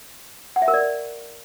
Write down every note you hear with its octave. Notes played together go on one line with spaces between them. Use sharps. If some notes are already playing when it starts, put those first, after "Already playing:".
F#5
E5
A#4
D5